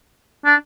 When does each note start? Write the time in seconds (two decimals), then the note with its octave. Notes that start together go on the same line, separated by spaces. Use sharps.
0.45 D4